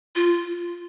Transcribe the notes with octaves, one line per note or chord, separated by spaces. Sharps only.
F4